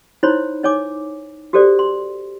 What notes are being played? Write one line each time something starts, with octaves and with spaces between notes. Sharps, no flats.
D#4 E4 C5 C#5 B5 C6
D#4 C#5 G#5 D6
F#4 G4 A4 C5 D5
C6